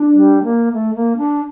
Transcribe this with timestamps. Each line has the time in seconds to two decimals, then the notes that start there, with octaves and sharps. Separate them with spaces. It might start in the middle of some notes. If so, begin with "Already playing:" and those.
Already playing: D4
0.14 G3
0.43 A#3
0.73 A3
0.95 A#3
1.17 D4